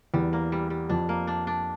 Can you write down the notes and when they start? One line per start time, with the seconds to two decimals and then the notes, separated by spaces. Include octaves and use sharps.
0.14 E2 G3
0.33 A#3
0.52 G3
0.70 G3
0.89 F2 D4
1.09 A#3
1.27 D4
1.47 D4